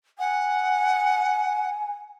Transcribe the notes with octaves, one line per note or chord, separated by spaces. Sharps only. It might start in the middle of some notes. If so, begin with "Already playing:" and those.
F#5 G#5